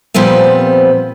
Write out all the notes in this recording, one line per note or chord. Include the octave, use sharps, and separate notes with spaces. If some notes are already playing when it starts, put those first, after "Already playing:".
A#2 F3 G3 B3 C4